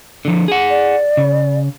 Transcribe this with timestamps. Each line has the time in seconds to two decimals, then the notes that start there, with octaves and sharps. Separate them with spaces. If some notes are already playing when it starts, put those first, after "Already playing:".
0.25 D3 F3
0.48 G#4 F#5
0.70 D5
1.17 C#3